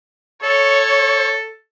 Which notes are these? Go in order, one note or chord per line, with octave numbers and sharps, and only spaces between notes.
A4 C#5